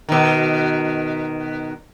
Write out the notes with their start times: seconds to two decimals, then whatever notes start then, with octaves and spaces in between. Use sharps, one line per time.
0.09 B2 D#3